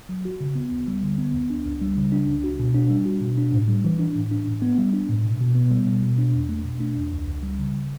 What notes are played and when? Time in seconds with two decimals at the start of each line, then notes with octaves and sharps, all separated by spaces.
0.09 F#3
0.25 F#4
0.41 C#3
0.55 B3
0.71 D2
0.87 G3
1.03 D3
1.18 B3
1.34 D2
1.50 D4
1.65 C#2
1.81 G3
1.97 C#3
2.12 D4
2.28 C#2
2.44 F#4
2.60 B2
2.74 D4
2.90 G3
3.05 F#4
3.21 B2
3.37 D4
3.52 A2
3.68 G3
3.85 E3
3.99 D4
4.15 A2
4.31 D4
4.47 A2
4.62 B3
4.78 G3
4.93 D4
5.09 A2
5.24 B2
5.41 B2
5.55 B3
5.71 G3
5.86 B2
6.02 B2
6.18 D4
6.34 E2
6.49 A3
6.65 B2
6.81 D4
6.96 E2
7.13 C#2
7.28 C#2
7.43 G3
7.59 C#3